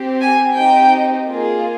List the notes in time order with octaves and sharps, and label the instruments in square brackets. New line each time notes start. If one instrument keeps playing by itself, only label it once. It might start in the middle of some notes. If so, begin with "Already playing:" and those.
Already playing: [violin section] C4 G4
G#5
C4 D#4 G4 G5
A#3 F4 G#4